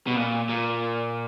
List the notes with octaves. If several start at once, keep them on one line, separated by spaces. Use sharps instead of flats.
B2
A#2
A#2